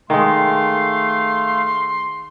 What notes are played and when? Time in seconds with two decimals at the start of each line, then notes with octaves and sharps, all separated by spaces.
0.10 D#3 G#3 A3 F5 C6